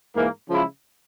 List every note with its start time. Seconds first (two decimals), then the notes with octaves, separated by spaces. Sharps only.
0.15 G#2 E3 A#3
0.50 C#3 F3 G#3 E4